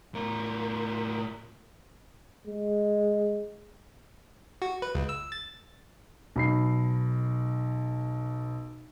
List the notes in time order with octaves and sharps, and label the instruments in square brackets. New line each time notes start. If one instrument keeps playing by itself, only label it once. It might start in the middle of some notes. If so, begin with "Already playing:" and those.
[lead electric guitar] A2 A#4
[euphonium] G#3
[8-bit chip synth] F#4
B4
C#2
E6
A6
[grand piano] B1 B5 C7